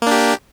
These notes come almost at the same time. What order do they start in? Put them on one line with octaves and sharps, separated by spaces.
A#3 D4 G4